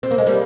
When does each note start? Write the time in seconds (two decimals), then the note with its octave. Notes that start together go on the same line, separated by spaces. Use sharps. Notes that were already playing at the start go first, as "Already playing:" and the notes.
0.03 C4
0.11 A#3
0.18 G#3
0.26 G3 A#3